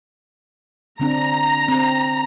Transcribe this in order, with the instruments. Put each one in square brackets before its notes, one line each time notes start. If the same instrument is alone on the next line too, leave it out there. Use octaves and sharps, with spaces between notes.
[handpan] D3 C4 D4 [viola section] A#5
[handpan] C4